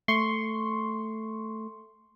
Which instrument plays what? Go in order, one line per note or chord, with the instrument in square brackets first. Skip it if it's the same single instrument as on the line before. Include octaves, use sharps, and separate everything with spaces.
[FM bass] A3 [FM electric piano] C6 C#6